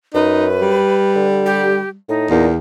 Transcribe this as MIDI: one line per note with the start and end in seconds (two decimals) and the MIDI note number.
0.14 0.82 42
0.14 0.47 63
0.14 1.27 71
0.62 1.96 55
1.15 1.77 50
1.46 1.89 67
2.09 2.28 45
2.09 2.46 63
2.30 2.58 40
2.30 2.48 46